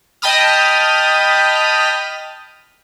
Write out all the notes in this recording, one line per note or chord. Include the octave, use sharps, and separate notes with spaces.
D#5 G5 A5 B5 D#6 F6